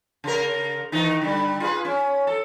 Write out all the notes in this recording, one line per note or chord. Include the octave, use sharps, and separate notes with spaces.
C#3 A#4
D#3 E3 D#4
D3 G3
F4 G#4 B4
C#4
A4